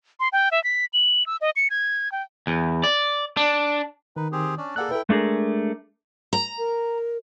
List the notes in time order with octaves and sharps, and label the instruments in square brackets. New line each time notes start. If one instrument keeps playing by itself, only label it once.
[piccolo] C6
G5
E5
B6
F#7
E6
D#5
C#7
G#6
G5
[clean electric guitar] E2
D5
D4
[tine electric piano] D#3 [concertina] D#4 B4
[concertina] C4 G4 G#4
C#4 D4 D5
[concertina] A#3 A4 D5 [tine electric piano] G#4 F#5 F#6
[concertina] E4 G5 [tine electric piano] A4 B4
[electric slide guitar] G#3 A3 D4 G#4 A#4
[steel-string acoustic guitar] A#5
[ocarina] A#4